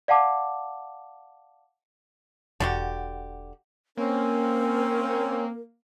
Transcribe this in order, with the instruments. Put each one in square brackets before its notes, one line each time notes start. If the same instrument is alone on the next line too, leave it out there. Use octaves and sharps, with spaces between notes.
[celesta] D5 F5 F#5 A5 D6
[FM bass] E1 [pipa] D3 F#4 G4
[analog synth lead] A#3 [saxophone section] C4 C#4 [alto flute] A#4